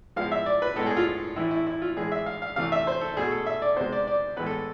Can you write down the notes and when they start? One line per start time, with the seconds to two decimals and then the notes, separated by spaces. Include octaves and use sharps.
0.16 A2 F3 G#3 B3 F5
0.32 E5
0.46 D5
0.62 B4
0.76 A2 G#3 B3 A4
0.86 G#4
0.97 F4
1.36 A2 E3 A3 E4
1.51 E4
1.67 E4
1.82 F4
1.96 A2 E3 G#3 G#4
2.12 E5
2.26 F5
2.42 F5
2.56 C3 E3 A3 F5
2.72 E5
2.87 C5
3.01 A4
3.17 B2 A3 G#4
3.31 A4
3.46 E5
3.62 D5
3.76 C3 G#3 B3 C5
3.92 D5
4.07 D5
4.37 A2 E3 G#3 B3 B4
4.46 A4